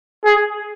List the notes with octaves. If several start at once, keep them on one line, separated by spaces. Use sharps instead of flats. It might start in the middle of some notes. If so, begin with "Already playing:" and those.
G#4